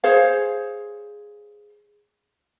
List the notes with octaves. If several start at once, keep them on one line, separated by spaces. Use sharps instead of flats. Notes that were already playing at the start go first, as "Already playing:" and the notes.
G#4 C5 C#5 F5